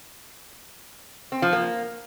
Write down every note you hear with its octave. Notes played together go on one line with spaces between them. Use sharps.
C4
F3
A#3